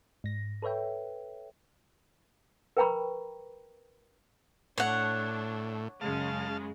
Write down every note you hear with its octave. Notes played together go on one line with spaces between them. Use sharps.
G#2 A#6
A4 B4 C#5 E5 G5
A#4 B4 G5 A#5 B5 C#6
A2 D4 C#5 F#5
F#2 C#3 G#3 F5 A5